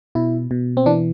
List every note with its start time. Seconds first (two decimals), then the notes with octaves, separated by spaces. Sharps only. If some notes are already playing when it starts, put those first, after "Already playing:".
0.15 B2 E4
0.51 B2
0.77 C4
0.86 E3 D4